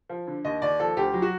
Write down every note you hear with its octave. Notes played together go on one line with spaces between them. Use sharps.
F3
D3
D#2 D#5
D#2 D5
F3 A4
D2 G4
F#3
F#4